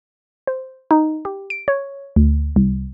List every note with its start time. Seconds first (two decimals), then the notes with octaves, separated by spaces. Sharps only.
0.47 C5
0.91 D#4
1.25 G4
1.50 D7
1.68 C#5
2.16 D2
2.56 C2